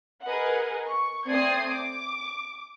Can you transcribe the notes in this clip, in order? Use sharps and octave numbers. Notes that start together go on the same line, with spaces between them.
G#4 A#4 B4 D#5 F#5
C#6
A3 C4 D5 D#6 G#6 C7
D6